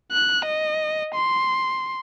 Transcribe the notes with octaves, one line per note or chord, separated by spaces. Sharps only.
F#6
D#5
C6